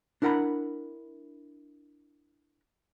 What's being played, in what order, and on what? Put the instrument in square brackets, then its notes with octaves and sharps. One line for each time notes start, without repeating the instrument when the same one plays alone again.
[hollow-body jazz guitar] D4 E4 A#4 F#5 A#5 B5